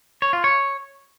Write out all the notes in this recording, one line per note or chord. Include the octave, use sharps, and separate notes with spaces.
C#5
F4
C#5